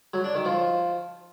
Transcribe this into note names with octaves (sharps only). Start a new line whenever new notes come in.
F#3
D4
D#3
F3